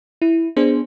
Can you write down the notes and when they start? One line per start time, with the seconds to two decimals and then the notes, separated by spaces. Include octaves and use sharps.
0.22 E4
0.56 B3 D4 G#4 C5